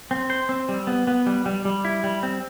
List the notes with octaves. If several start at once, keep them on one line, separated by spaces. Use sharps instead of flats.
C4
C5
C4
G3
B3
B3
G3
G3
G3
E4
G3
C4